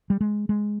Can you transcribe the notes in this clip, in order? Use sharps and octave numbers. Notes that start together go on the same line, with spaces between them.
G3
G#3
G#3